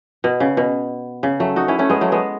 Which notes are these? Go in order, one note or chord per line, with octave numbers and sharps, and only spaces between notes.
B2
C#3
B2
C#3
F#3 A3
D#4 F#4
C#4 E4
A3 C#4
G#3 B3
F#3 A3
G#3 B3